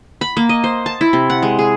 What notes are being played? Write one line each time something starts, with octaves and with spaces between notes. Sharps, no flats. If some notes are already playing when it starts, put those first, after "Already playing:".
B5
A#3
D#5
C5
A5
E4
C3
F#5
G#3
G#4